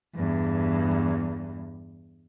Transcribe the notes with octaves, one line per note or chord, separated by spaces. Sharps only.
E2 G2